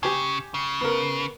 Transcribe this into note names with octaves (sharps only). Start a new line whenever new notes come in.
C#3 G4 G#5
C#3
B3 A#4